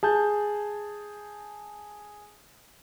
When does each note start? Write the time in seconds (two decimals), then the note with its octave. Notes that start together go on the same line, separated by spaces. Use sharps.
0.03 G#4 A5 G6